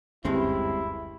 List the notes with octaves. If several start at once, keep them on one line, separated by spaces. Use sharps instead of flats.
F#1 D2 G2 G#3 C4 C#4 E4